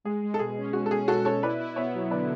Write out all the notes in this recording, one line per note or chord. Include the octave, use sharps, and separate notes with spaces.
G#3 G#4
G#3
A4
B2 G#4
C#4
B2 F#4
A4
C#4 G#4
B2 F#4 A4
B2 A4 C#5
E4 B4 D5
E4
B3 C#5 E5
F#3
D3 B4 D5